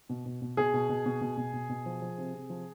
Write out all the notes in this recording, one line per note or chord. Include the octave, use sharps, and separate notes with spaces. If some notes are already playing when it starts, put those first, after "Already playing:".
B2
B2
B2
B2 G#4
B2
B2
B2
B2
B2
B2
B2
F3
F3
C3
C3
F3